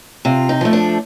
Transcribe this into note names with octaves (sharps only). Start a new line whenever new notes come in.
C3 F4
D#4
F3 A3
D4